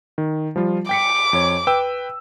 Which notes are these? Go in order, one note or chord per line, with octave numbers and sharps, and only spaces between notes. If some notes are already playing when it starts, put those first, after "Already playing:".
D#3
F3 G3 F4
G5 D6 B6 C#7
F2 C#5
B4 G5 E6